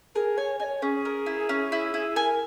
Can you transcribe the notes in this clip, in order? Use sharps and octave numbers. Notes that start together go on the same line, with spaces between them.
G#4 A#4
C#5 G#5
C#5 D#5 G#5
C#4 G#4
A#4
E4
C#4
E4
E4
A#4 G#5